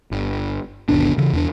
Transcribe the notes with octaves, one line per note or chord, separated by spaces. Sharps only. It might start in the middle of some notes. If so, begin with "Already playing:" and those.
G1
G1 D#2 B2 D4
C#3 E3
E2 D4